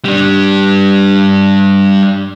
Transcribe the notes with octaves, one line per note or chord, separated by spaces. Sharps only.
G3 D4